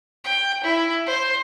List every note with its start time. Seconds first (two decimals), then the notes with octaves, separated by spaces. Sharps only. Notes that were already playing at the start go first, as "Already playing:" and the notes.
0.24 G5
0.64 E4
1.06 C5